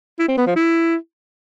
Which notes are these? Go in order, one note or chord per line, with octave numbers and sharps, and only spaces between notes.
E4
C4
B3
F3
E4